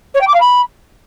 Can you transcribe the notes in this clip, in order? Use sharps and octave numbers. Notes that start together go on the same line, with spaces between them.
C#5
G5
D6
F5
B5